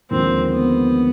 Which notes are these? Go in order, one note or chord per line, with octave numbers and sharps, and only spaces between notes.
D#2 D3 F3 G#3 C4
B3